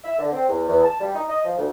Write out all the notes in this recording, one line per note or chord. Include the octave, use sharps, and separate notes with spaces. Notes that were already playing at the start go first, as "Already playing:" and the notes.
E5
D3
C4
E2
E2
A5
G3
D#4
D#5
F3
D2